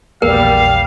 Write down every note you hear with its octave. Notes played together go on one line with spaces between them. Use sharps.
A#1 E2 G3 A#3 A#4 F5